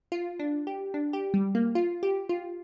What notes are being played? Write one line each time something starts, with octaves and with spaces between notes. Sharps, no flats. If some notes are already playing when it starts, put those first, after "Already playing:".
F4
D4
G4
D4
G4
G3
A#3
F4
G4
F4